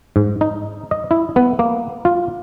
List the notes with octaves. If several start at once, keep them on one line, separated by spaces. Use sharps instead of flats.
G#2
D#4
D#5
E4
B3
A#3
F4